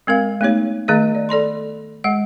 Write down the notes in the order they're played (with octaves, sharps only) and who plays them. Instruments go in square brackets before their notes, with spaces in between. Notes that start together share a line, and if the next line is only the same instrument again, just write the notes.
[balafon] G#3 C4 A#4 F5
A3 B3 D#4 G4 C#5
D#3 A3 G#4 D#5
D5
A4 D5 B5 C6
G#3 F#5